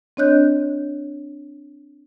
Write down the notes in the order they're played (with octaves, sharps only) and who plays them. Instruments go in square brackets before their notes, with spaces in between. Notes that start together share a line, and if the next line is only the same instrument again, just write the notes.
[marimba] C4 D4 C#5 D#5 F#6 G6